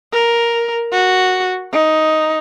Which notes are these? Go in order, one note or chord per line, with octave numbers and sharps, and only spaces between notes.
A#4
F#4
D#4